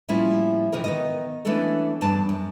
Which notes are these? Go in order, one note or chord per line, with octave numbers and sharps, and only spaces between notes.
A2 F3 G3 A#3 C#4 E4
C3 E3 F3 D#4 A#4
D#3 B3 D#5
E3 A3 B3 C#4 D4 A4
E2 G2 D4 A5
F#2